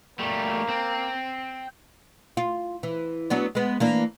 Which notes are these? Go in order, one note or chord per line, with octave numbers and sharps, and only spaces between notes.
G3 A3 A#3
C4
F4
E3
F#3 B3 D4
G#3 B3
E3 A#3 D4